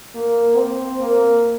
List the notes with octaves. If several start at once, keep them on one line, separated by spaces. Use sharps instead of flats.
A#3
C4
A#3